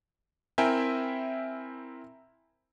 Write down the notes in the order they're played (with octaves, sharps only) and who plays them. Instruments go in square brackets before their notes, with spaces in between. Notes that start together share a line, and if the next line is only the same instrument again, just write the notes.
[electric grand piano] C4 E4 A#4 E5 G5 G#5